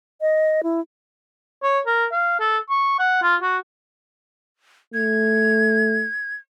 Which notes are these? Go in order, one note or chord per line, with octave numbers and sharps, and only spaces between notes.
D#5
E4
C#5
A#4
F5
A4
C#6
F#5
F4
F#4
A3 G#6